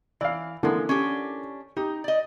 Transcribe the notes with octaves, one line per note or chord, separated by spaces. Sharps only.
E3 D5 F5
D3 E3 F3 G#3 A#3
C#4 D4 G4
D#4 G4
D5 D#5